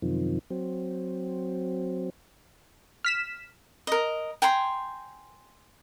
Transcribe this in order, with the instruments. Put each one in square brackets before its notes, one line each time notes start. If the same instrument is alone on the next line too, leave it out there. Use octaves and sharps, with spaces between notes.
[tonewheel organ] F#2 C3 D#3 F3
F#3 C4
[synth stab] F6 B6 E7
[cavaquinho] A#4 D#5
G5 G#5 A#5 C6